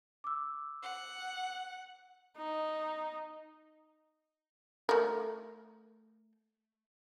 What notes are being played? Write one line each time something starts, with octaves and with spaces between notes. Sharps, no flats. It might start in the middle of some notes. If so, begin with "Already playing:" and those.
D6 E6
F#5
D#4
A3 A#4